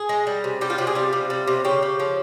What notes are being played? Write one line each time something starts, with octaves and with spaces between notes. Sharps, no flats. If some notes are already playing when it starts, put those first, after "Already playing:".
Already playing: G#4
G#3
G3
C3
G3 G4
F4
C3 G4
G#4
G3 F4
C3
G3
C3
C#3 G4
C#3
F3